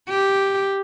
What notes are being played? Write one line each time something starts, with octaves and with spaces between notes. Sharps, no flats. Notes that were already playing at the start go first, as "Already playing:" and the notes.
G4